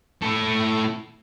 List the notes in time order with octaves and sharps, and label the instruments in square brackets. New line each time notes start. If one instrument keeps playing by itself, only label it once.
[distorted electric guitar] A3 E4